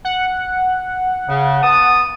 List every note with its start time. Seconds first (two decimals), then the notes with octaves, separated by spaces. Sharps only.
0.05 F#5
1.27 C#3
1.62 B3 A5 D#6